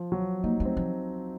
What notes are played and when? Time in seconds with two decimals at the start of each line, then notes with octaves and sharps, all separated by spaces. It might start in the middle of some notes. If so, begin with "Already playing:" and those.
Already playing: F3
0.12 F#3
0.44 A#3 D#4
0.60 A3
0.65 C4
0.77 F3